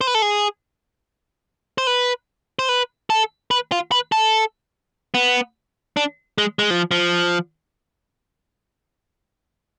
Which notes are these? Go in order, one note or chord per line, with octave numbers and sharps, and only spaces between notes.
C5
B4
A4
G#4
C5
B4
C5
B4
A4
B4
F4
B4
A4
B3
D4
G#3
G#3
F3
F3